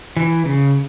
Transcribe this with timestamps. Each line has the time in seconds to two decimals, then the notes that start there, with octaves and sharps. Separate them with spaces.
0.17 E3
0.45 C#3